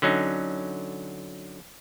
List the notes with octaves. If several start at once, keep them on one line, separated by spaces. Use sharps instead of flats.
D3 F#3 C#4 D#4